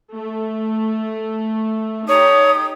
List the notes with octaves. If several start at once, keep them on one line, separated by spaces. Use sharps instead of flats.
A3
D#4 G4 A4 C#5 D#6